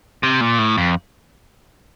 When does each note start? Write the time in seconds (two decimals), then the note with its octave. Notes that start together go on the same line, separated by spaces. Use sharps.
0.23 C3
0.41 A#2
0.59 A2
0.78 F2